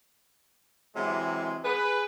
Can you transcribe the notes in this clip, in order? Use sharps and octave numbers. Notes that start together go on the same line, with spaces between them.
C3 E3 F#3 G#3
G#4 B4